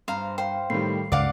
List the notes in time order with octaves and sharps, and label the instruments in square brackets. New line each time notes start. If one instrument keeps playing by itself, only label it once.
[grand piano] G2 [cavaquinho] C5 F5 A#5
[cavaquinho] C5 [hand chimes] F5 G5
[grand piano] A2 D#3 G3 [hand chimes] C7
[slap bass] C#2 G2 C#3 [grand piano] D5 [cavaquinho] F5 F#5 D6